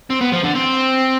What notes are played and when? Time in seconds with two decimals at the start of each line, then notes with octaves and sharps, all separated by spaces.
0.10 C4
0.21 B3
0.32 F3
0.44 D3
0.55 C4